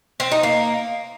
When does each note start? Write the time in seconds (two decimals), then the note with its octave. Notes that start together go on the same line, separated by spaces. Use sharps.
0.20 C4
0.32 D#4
0.43 A#3